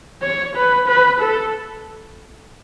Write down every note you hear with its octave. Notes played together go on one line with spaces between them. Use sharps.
C#5
B4
B4
A4